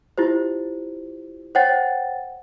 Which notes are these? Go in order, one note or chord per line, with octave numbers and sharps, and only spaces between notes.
E4 F4 G4 C5
C5 C#5 F#5 G5 A6